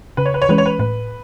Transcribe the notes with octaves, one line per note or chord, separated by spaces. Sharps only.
C#3 B4
C#5
B4
C#5
E3 G#3 C#4 B4
C#5
B4
A2 B4